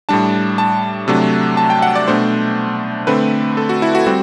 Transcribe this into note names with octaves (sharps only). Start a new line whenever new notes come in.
A2 G3 D4 A5
A5
C3 F#3 A3 D4
A5
G5
F#5
D5
B2 A3 D4 C5
D3 A3 C4 B4
A4
F#4
E4
F#4
G3 C4 F#4